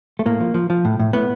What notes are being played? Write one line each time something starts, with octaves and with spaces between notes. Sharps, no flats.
A3
A2 A#3
F3
F3
F3
A2
A2
A2 B3